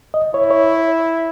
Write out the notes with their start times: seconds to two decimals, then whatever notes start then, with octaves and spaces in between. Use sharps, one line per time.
0.14 D#5
0.34 E4 C#5
0.50 C#5